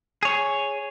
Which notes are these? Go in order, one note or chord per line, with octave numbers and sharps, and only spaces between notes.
G#4 C#5